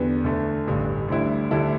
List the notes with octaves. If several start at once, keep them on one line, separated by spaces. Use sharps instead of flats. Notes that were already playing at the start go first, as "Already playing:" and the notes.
Already playing: E2 D3 B3 G4
D2 D3 A3
A1 G2 D3
D2 D3 G3 E4
D2 D3 G3 E4 A4